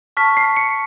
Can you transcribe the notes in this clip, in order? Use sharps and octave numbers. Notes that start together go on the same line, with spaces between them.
A5 C#6 F6 B6
C7
C#7